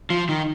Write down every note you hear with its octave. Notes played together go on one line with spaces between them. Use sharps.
F3
D#3